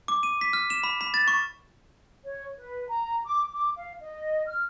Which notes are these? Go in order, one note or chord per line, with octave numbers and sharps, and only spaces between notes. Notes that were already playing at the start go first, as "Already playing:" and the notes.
D6
D#7
B6
F6
E7
B5
B5
A6
C#6
C#5
B4
A#5
D6
D6
F5
D#5
F6